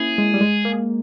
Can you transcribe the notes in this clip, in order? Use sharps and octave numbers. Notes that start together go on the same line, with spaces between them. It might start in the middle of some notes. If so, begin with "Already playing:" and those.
Already playing: A#3 C#4 E4 G#4
G#3
G3
G#3
A#3